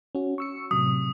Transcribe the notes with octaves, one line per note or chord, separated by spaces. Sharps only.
C#4 F#4
C#6 E6 C#7
A2 C3 F#3 D#6